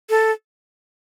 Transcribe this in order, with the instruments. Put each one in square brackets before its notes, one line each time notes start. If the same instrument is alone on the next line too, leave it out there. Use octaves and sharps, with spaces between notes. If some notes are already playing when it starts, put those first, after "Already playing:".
[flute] A4